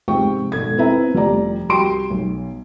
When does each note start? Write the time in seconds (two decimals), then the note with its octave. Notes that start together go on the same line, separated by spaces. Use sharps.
0.08 G#2 C3 F3 C4 G5 C#6
0.52 G#1 B2 A4 G#6
0.77 B3 C4 E4 B4 E5 A#5
1.14 F1 F3 G3 D5 A#5
1.69 C2 F#4 G4 G5 C6 D7
2.11 B1